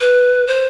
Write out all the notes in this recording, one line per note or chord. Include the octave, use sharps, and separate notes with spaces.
B4
C5